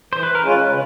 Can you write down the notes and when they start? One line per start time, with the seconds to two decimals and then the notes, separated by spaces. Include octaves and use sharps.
0.13 E3 C5
0.23 B4
0.35 A#4
0.41 G#3 C#4 F4 B4
0.70 C#3